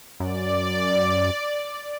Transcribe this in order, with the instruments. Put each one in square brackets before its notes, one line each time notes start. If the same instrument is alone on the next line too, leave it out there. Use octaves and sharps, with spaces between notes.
[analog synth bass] F#2 [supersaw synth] D5